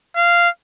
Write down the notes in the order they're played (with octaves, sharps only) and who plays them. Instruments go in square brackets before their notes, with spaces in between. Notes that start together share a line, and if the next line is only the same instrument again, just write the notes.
[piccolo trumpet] F5